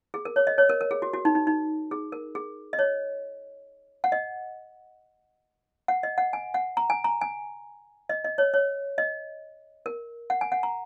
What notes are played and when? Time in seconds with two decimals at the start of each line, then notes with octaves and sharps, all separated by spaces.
0.14 G#4
0.25 A#4
0.36 C#5
0.47 D#5
0.58 C#5
0.69 A#4
0.81 A#4
0.91 G#4
1.02 F#4
1.13 F#4
1.25 D#4
1.35 D#4
1.47 D#4
1.91 G#4
2.12 A#4
2.35 G#4
2.73 D#5
2.79 C#5
4.04 F#5
4.12 D#5
5.88 F#5
6.03 D#5
6.18 F#5
6.33 G#5
6.54 F#5
6.77 A#5
6.90 G#5
7.04 A#5
7.21 G#5
8.09 D#5
8.24 D#5
8.38 C#5
8.54 C#5
8.98 D#5
9.86 A#4
10.30 F#5
10.41 G#5
10.52 F#5
10.63 A#5